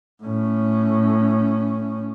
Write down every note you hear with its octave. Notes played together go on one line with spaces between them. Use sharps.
A2 C#4